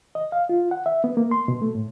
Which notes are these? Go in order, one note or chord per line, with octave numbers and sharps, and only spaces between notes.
D#5
F5
F4
F#5
E5
B3
A#3
C6
B2
A3
A2